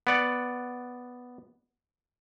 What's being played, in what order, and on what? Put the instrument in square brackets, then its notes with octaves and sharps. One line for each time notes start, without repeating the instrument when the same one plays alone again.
[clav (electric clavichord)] B3 D5 F#5